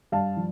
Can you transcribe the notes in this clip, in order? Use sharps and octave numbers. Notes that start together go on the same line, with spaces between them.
G2 F5 A5
F3